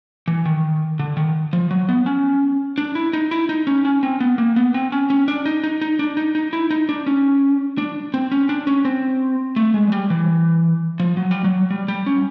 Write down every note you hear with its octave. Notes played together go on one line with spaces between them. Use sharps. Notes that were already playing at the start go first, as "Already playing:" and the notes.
E3
D#3
D3
D#3
F3
F#3
B3
C#4
D4
E4
D#4
E4
D#4
C#4
C#4
C4
B3
A#3
B3
C4
C#4
C#4
D4
D#4
D#4
D#4
D4
D#4
D#4
E4
D#4
D4
C#4
D4
C4
C#4
D4
C#4
C4
A3
G#3
F#3
G3
E3
F3
F#3
G3
F#3
G3
G3
C#4